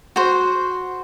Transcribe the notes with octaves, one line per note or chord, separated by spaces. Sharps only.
F#4 C5